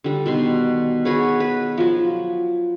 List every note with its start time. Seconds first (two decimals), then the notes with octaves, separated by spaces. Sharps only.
0.04 D3 G3
0.26 B2 D#3 C6
1.05 F#4 G#4 B4 C#5
1.40 B4
1.78 F3 F#3